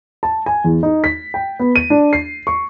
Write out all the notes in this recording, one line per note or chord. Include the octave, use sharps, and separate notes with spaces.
A5
G#5
E2
D#4
B6
G5
B3
D#7
D4
C7
C#6